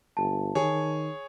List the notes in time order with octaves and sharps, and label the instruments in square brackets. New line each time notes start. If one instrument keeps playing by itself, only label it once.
[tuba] G1 [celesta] A5
[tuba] D#3 [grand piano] G#4 C#5